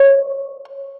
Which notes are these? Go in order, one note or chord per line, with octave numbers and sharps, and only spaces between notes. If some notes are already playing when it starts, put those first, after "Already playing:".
Already playing: C#5